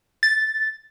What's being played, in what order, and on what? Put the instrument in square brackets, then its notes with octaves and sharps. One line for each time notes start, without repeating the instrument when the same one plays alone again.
[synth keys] A6